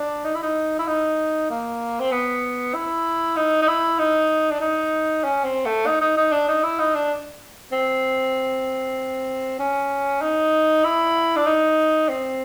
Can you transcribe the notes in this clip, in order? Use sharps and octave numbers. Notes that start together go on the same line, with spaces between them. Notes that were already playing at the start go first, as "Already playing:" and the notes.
Already playing: D4
D#4
E4
D#4
E4
D#4
A#3
C4
B3
E4
D#4
D#4
E4
D#4
D4
D#4
C#4
C4
A3
D#4
D#4
D#4
D4
D#4
E4
D#4
D4
C4
C#4
D#4
E4
D4
D#4
C4